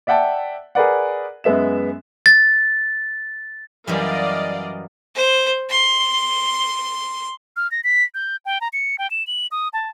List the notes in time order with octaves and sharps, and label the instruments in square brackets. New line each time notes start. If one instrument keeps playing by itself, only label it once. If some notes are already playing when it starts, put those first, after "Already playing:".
[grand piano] D5 E5 F#5 G5 A5
G#4 A#4 B4 D5 F#5
F#2 G#3 B3 E5 E7
[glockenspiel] A6
[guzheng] F#2 E3 G3 [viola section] D5 D#5 F5
[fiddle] C5
C6
[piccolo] F6
A#6
B6
G6
G5
A#5
C#7
G5
E7
F#7
D#6
A5